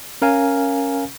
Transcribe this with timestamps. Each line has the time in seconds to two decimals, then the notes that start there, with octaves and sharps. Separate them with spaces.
0.22 C#4 A#4 F5 G#5